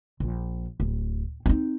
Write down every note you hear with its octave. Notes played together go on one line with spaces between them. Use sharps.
A#1
D1
C4 D#4